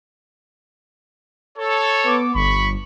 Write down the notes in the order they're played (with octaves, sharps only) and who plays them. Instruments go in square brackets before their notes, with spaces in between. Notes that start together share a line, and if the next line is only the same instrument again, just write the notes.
[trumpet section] A4 C#5
[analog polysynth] B3 D6
[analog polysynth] G1 [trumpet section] B5 C#6